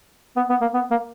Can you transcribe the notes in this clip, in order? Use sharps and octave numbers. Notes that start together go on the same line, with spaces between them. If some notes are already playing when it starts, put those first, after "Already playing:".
B3
B3
A#3
B3
A#3